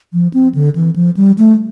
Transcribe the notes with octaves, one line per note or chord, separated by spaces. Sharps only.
F3
C4
D3
E3
F3
G3
A3